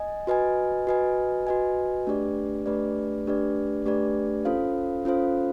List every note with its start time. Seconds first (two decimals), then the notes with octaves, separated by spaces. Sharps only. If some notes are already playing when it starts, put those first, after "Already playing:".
Already playing: D#5 G#5
0.27 F#4 B4 D#5 G#5
0.87 F#4 B4 D#5 G#5
1.47 F#4 B4 D#5 G#5
2.07 A3 D4 G4 B4 D5
2.66 A3 D4 G4 B4 D5
3.26 A3 D4 G4 B4 D5
3.86 A3 D4 G4 B4 D5
4.45 C#4 F4 A4 C5 F5
5.05 C#4 F4 A4 C5 F5